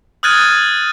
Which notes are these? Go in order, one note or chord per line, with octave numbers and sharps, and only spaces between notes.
D#6 F6 F#6 G#6 A6 D#7